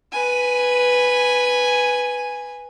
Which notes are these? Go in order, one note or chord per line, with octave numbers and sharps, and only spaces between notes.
B4 G#5